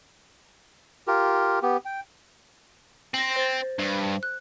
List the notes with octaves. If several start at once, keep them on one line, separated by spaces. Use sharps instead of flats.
F4 G4 A#4
B3 G4
G5
C4 A#6 F#7
C5 A6
G2
F#6